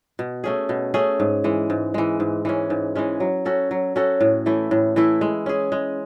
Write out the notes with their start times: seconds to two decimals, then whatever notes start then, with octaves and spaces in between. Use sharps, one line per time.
0.19 B2
0.44 A3 C#4 G#4
0.69 B2
0.94 A3 C#4 G#4
1.20 G#2
1.44 E3 G#3
1.70 G#2
1.94 E3 G#3
2.20 G#2
2.45 E3 G#3 C#4
2.70 G#2
2.95 E3 G#3 C#4
3.20 F#3
3.45 C#4 F#4 A4
3.71 F#3
3.96 C#4 F#4 A4
4.21 A2
4.46 E3 A3 E4
4.71 A2
4.96 E3 A3 E4
5.21 G#3
5.46 C#4 G#4
5.72 G#3